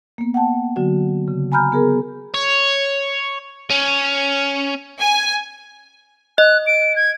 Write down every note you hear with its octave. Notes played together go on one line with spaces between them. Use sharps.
A#3 B3
F#5 G5 A5
D3 F#3 F#4
C#3
G#5 A#5 B5 F6 G6
B3 G#4 A#4
C#5
C#4
G#5
D#5 F#6
D7
G#6